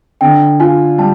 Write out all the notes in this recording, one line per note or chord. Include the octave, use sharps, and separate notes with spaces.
D3 G5
F4 G#5
G3 A5